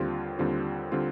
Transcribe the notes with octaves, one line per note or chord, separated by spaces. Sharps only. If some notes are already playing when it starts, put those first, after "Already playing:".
Already playing: D#2 D3 G3 C4 F4
D#2 D3 G3 C4 F4
D3 G3 C4 F4